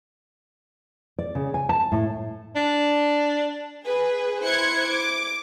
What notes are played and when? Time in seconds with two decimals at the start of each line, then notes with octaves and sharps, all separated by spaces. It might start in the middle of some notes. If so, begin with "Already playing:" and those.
1.19 D5
1.35 C#3
1.54 G#5
1.69 A5
1.92 A2
2.56 D4
3.86 G#4 B4
4.44 E4 C5 F#6 G#6 C#7
4.89 D6